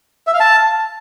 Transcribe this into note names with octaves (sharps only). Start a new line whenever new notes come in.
E5
F5
A5